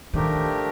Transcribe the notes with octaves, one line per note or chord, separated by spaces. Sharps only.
D#3 F3 A3 D4 G4 A#4